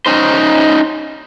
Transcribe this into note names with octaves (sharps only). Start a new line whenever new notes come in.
C#4 D#4 C5